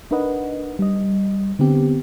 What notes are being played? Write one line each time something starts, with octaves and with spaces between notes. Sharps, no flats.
D4 D#4 A#4 B4 D#5 F#5
G3 D#5
D3 B3 C4 G4